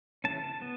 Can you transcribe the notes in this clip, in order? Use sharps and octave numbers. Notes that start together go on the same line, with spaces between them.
C#3 E3 A3 C#4 A5
B3